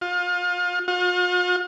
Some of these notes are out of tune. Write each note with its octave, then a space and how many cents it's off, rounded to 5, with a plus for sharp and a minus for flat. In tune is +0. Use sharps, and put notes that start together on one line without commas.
F4 +30
F4 +45